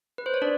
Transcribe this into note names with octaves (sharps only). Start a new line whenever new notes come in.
B4
C5
C#5
D4 D5